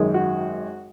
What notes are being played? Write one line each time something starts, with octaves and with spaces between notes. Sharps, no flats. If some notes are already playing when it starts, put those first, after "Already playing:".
Already playing: G#1 F#2 D#3 G#3
F#4